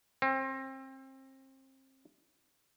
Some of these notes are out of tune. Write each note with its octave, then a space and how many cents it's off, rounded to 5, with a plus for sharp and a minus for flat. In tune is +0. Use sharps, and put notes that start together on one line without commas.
C4 +30